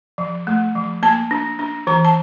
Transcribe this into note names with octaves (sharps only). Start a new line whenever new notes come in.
F3
A3
F3
A#3 A5
D4
D4
E3 A#5
A5